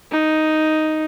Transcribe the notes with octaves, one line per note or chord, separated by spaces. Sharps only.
D#4